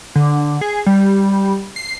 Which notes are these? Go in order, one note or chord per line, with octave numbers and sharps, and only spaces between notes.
D3
G#4
G3
C7